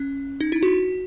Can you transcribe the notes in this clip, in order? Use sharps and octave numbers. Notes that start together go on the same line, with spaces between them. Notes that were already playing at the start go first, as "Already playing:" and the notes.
Already playing: C#4
D#4
E4
F#4